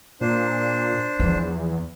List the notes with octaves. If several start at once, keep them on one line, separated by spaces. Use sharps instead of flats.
A#2 D4 C5
E2 F3